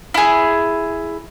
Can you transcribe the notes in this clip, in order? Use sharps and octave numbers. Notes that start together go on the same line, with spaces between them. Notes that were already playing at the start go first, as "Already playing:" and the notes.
E4 G#4